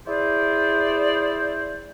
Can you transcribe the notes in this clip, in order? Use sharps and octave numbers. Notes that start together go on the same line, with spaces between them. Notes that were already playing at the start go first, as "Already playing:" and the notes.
E4 G#4 C5 D5